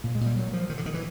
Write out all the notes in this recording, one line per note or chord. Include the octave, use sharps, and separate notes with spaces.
A#2 A#3
G#3
A#2
G3
A#2 F#3
A#2 F3
A#2 D#3
D3
A#2 D#3
E3